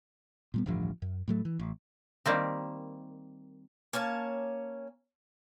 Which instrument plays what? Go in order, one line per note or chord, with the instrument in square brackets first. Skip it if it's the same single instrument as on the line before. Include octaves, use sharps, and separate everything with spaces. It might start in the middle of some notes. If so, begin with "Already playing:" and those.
[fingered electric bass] A#2 G3 B3
D1 A1 G2 F3
F#2
A2 F#3 A3
E3
A1
[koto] D#3 G3 A#3 C4
[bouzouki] A#3 C#4 C#5 A5